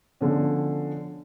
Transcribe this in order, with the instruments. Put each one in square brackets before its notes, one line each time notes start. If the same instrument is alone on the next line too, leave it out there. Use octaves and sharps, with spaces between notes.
[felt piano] B2 D3 F3 C#4